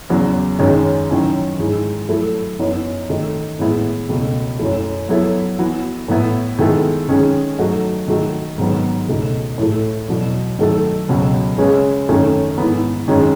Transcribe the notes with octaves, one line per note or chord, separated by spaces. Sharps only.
E2 C#3 F#3
F#2 D#3 G#3 C#4
D#3 F#3 C#4 E4
G#2 E3 G#3
F#3 A3 E4 A4
F#2 E3 B3 D#4
D#3 A3 D#4
A2 E3 G#3 B3 E4
C#2 B2 A3
F#2 E3 A3
F#3 B3 E4 A4 C#5
E3 B3 F#4
A2 E3 B3 E4
D#3 G#3 B3 E4 A4
D#3 G#3 C#4 G#4
F#3 A3 D#4 F#4
D#3 A3 D#4 F#4 A4
G#2 D#3 F#3 B3
C#2 B2 A3 D#4
A2 E3 A3
E2 B2 F#3
D#3 F#3 A3 D#4 A4
C#2 B2 F#3 C#4
C#3 G#3 C#4 G#4 B4
F#2 D#3 A3 C#4
G#2 E3 B3
F#2 D#3 G#3 C#4